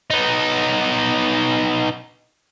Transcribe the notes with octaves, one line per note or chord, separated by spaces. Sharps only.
B3 D#4